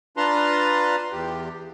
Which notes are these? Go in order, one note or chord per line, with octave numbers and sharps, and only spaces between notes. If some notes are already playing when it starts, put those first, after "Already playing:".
D4 F4 B4 A5 A#5 C6
E2 G4